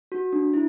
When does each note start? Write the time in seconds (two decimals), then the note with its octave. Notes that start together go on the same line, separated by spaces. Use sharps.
0.12 F#4
0.33 D4
0.54 E4